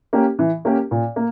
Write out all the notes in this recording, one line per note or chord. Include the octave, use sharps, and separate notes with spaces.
A#3 C#4 G4 A#4
E3
A#3 C#4 G4 A#4
A#2
A#3